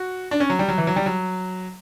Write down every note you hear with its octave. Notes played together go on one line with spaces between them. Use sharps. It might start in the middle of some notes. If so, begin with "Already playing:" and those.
Already playing: F#4
D4
C#4
F#3
G3
F#3
E3
F#3
G3
F#3